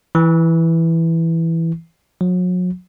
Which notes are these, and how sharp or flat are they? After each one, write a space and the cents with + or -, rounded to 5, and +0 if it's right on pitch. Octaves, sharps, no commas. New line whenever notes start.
E3 +0
F#3 -40